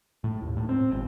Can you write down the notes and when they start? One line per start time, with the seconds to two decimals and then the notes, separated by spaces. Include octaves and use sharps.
0.24 A2
0.42 D#2
0.57 A2
0.69 C4
0.91 G1